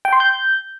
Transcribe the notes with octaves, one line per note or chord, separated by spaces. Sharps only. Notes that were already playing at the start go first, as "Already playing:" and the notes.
G5
C6
G6